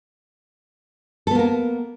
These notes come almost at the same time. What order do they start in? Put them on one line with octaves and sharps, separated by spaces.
A4 B3 A#3 A#4